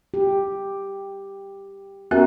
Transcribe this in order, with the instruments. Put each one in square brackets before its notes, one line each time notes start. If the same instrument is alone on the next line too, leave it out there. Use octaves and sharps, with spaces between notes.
[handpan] G4
[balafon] B3 C#4 E5 [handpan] F#4 A#4